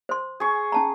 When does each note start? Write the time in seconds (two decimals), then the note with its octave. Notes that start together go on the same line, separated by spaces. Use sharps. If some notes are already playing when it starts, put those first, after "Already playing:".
0.09 C5 C6
0.40 G#4 C#6
0.72 C#4 A5 A#5